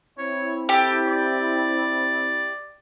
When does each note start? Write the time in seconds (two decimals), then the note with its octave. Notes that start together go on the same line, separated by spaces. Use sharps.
0.18 C4 E4 C#5
0.69 G4 A4
1.07 D5